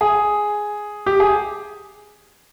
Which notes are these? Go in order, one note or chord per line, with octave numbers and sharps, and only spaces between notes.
G#4
G4
G#4